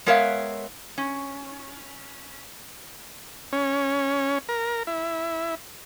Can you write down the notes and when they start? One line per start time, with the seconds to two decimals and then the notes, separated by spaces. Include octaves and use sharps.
0.06 G#3 B3 A#4 C#5 E5 F5
0.98 C#4
3.53 C#4
4.49 A#4
4.87 E4